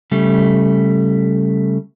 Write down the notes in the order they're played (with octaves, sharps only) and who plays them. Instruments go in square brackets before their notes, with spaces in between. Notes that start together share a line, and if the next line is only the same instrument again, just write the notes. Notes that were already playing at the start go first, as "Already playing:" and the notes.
[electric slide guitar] C#3 G3 A3